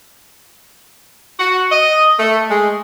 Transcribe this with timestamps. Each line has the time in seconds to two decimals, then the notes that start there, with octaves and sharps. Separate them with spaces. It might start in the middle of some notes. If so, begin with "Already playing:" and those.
1.40 F#4
1.72 D#5
2.19 A3
2.50 G#3